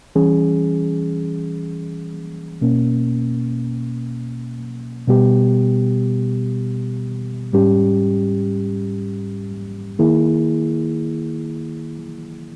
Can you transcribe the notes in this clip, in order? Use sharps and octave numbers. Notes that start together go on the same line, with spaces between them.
E3 G3 C#4 G#4
B2 A#3 C#4
B2 G3 B3 G4
G#2 G3 C#4 G4
D#3 A#3 E4 G#4